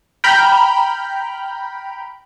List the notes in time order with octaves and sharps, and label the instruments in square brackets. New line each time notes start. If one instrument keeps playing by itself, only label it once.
[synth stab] G5 A#5 B5 F6 G6